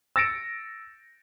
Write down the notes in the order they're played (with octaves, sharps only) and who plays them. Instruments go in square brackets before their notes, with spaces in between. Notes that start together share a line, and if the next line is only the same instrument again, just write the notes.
[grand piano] E6 A6 A#6 C#7 D7 E7